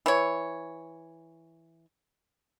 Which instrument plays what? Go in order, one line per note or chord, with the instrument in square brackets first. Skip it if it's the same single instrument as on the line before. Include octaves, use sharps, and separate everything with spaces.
[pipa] E3 C#5